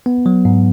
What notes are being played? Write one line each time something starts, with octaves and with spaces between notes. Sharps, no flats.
B3
F#3
G#2